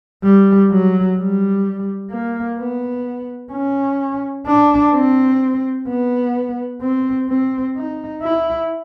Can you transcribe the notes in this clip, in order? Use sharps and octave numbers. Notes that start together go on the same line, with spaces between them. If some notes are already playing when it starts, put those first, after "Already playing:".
G3
F#3
G3
A#3
B3
C#4
D4
C4
B3
C4
C4
D#4
E4